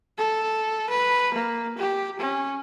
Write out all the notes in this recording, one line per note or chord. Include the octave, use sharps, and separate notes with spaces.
A4
B4
A#3
G4
C#4